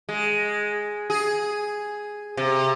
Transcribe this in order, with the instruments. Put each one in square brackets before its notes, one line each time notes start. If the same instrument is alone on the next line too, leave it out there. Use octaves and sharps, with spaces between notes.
[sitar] G#3
G#4
C3